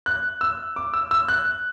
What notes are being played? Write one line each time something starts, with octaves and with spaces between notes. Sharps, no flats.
F#6
E6
D6
E6
E6
F#6